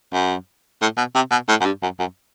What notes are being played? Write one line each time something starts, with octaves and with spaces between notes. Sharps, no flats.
F#2
A2
B2
C3
B2
A2
F#2
G2
F#2
F#2